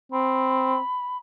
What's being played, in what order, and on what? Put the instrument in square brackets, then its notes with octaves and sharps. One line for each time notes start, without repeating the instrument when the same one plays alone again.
[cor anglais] C4 [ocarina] B5